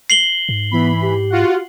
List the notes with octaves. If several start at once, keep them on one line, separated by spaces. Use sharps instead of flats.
C7 F#7 G7
G#2
E3 B3 B5
G4
F4 F#4 F#5